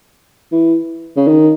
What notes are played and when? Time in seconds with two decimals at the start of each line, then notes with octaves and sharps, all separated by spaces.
0.52 E3
1.16 C#3
1.27 D#3